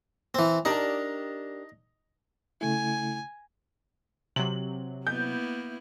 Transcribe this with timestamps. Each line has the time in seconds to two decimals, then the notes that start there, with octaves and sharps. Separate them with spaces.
0.34 E3 C4
0.65 D4 D#4 G4 A#4
2.61 C#3 A3 E4 G#5
4.36 C3 F#3 F#7
5.07 A#3 B3 E4 G6